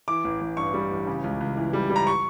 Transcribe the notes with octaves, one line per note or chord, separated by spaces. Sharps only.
E3 D6
A1
A1
G2 C#6
G3
A1
C#3
C#2
C#2
E3
G3
G3
A#5
C#6